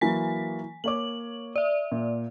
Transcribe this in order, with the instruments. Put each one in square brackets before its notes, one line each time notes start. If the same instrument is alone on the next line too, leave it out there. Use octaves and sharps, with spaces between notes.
[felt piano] E3 F#3 A#3 [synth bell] G#5 B6
[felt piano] A#3 C#5 D6 [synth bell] F#7
[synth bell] D5 E5
[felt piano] A#2